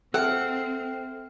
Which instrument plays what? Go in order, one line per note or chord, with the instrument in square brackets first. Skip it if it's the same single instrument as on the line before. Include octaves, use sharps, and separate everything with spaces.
[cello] C4 [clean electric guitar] A4 G5 [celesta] E5 F6 [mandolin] F#5